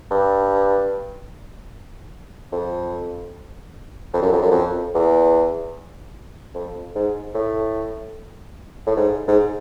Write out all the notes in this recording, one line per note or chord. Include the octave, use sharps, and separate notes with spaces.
G2
F2
F2
F#2
F2
F#2
F2
E2
F2
G#2
A2
A2
G#2
G#2